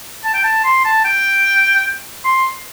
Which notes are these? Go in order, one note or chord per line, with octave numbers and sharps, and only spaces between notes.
A5
G5
A5
C6
A5
G5
C6